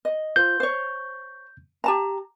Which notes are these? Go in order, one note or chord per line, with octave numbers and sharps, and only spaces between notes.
D#5
F4 C5 G6
C5 C#5
G4 A5 A#5